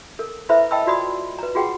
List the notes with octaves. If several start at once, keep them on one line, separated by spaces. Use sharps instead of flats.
A4 A#4
E4 A4 B4 C5 E5 B5
D#5 G5 A5 B5 E6
F4 F#4 D5 B5 D#6
B4 A#5
F4 F#4 G#4 F#5 G5